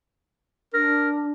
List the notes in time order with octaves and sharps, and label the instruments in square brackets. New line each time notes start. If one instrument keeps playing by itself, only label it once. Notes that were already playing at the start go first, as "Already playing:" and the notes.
[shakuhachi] D4 [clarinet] A#4